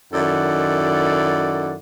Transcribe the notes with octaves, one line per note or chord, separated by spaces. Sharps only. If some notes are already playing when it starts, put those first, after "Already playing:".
F#2 D#3 E4 A4 D5 F#5